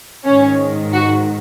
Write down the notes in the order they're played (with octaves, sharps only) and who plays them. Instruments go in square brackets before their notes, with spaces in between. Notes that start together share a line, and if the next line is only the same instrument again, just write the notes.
[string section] G#2 D#3 C#4
F#4